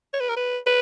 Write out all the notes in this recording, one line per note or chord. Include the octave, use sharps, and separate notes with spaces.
C#5
B4
A#4
B4
B4